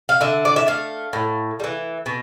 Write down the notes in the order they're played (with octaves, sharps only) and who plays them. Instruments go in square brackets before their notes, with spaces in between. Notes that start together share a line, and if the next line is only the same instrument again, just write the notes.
[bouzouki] F5
D3 E5
D5
E5
A3 F5
A2
G3
E3
B2